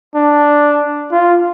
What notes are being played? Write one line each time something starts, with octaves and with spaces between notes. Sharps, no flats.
D4
F4